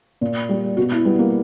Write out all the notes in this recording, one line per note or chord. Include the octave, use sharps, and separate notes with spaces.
A#2
G3
B2 F#4
E4
G3 B3
A#3